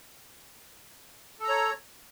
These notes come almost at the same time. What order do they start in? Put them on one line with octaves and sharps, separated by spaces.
A4 A#5 C#5